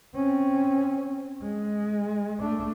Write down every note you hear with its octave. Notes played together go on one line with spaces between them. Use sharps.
C4 C#4
G#3
A3 D4